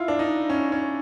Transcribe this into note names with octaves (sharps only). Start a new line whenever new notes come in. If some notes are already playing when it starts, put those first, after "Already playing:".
Already playing: E4 F4
D4
D#4
C#4
C#4